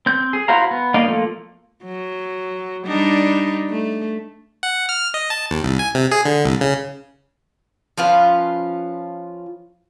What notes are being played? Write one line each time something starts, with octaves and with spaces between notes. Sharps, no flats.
C4 G6
G#4
E4 F#4 C5 F5 A#5
B3
A#3 D#4 D5 D#5 F5
F3 A3 A#3
F#3
G3 D4 D#4
A3
F#5
F6
D#5
A5
D#2
C2
G#5
C3
G#4
D3
C2
C#3
F3 C#4 F4 B4